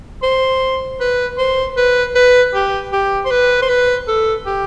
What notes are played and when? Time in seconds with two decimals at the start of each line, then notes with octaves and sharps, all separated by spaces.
0.23 C5
1.00 B4
1.38 C5
1.77 B4
2.15 B4
2.54 G4
2.92 G4
3.25 C5
3.31 B4
3.62 C5
3.69 B4
4.08 A4
4.46 G4